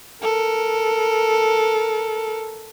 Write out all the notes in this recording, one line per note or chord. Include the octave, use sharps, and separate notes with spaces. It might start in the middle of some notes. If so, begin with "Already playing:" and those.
A4 A#4